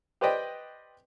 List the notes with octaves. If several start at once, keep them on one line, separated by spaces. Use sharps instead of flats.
G4 B4 C5 D5 D#5 G5